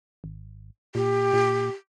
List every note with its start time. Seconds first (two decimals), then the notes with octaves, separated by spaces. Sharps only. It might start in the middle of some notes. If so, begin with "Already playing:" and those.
0.24 G#1
0.95 A#2 G4
1.33 A#2